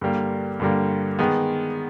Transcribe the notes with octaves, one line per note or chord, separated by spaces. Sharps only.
G2 D3 G3 A#3
G2 D3 G3 A#3
D#3 G#3 B3